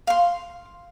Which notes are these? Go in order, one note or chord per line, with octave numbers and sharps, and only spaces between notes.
F5 C6